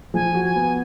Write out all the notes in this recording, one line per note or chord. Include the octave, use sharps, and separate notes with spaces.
F3 G#5
F#4
G#5
B3